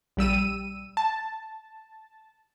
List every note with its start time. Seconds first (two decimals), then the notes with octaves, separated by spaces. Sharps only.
0.17 A#1 G3 E6 D#7
0.97 A5